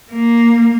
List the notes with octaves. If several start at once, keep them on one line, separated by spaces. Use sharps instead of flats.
A#3